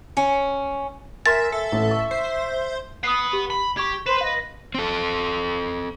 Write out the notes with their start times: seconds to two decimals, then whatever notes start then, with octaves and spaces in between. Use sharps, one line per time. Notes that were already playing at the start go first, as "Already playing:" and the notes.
0.17 C#4
1.26 A#4 E5 G#5 C6 A6
1.52 A4 E5
1.72 A1
1.91 C#6
2.11 C5
3.03 B4 F#5 D#6 C7
3.33 G4
3.50 B5
3.77 G4 C#6 G#6
4.06 B4 C5 C6 E7
4.21 D#5 F5
4.75 C4 A4